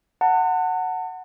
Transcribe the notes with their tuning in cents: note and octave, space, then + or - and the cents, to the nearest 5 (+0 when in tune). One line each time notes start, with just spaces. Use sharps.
F#5 +0 A5 +40